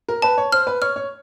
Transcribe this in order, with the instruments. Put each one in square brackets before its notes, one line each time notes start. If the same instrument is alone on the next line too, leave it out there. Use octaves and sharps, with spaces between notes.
[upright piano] A#4
[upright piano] B4 [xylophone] A5
[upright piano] C#5
[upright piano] C5 [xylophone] F6
[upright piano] B4
[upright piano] C#5 [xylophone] F6
[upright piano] C#5